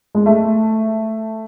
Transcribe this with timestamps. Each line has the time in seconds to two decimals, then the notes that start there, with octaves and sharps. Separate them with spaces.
0.15 G#3
0.26 A3